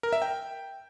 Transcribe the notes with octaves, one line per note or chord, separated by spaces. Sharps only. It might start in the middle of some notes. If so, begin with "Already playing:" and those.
A#4
E5
G5